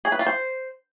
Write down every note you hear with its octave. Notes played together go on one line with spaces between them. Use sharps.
G#4
B4
F4
C5